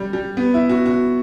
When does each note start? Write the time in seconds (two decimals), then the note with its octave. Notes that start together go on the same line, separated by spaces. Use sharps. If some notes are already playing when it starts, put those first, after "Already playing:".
Already playing: G3
0.13 G3
0.37 B3
0.54 E4
0.69 F#4
0.86 F#4